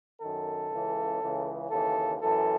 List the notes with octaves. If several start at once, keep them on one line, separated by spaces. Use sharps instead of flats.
F#2 D#3 A4
C#2 C#3 E3
C#2 C#3 E3
D#2 C#3 E3 A4
F#2 E3 A4